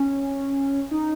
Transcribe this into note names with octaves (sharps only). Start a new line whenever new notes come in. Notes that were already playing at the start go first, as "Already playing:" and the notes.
Already playing: C#4
D#4